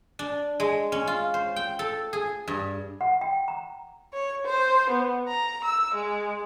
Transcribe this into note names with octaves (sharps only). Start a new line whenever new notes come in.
D4
G#3
C#4
F4
C5
G5
A4
G#4
G2
F#5
G5
A#5
C#5
C5
B3
A#5
E6
G#3